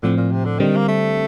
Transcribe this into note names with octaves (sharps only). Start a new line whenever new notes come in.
A2 D3 F3 C4
A#2
C3
D3
D3 D#3 G3 C4
A#3
A3